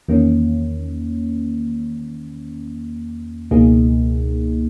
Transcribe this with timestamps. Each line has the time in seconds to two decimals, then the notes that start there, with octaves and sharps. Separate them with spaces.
0.08 E2 D#3 A#3 C#4
3.51 C#2 B2 A#3 D#4 G#4